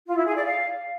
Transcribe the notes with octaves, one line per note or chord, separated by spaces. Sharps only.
F4
E4
G#4
D5
F5